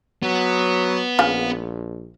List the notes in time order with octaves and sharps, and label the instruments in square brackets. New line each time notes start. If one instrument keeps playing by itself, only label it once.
[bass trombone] F#3 [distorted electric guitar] B3
[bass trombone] A#1 [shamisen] C#3 F4 F5